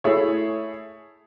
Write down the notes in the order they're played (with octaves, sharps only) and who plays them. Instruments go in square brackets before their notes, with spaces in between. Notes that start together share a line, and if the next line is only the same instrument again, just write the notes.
[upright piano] A3 E4 G#4 C#5